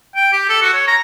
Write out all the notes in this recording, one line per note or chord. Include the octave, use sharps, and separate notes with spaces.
G5
G4
A4
F#4
C#5
A#5